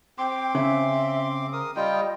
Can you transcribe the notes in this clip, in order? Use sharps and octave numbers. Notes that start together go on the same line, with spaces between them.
C4 G5 C6 D6
C#3 E5
A#4 D#6
G3 F4 D#5 G5